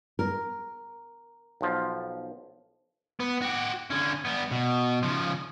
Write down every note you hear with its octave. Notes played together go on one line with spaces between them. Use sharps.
A#4
B1 F3
B3
F#4 G4
D3 C#4
G3 B3
B2
C#3 F3